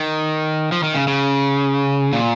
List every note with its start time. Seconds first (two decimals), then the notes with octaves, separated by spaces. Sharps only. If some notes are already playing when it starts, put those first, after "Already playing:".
Already playing: D#3
0.72 F3
0.83 D#3
0.95 C#3
1.08 C#3
2.13 A#2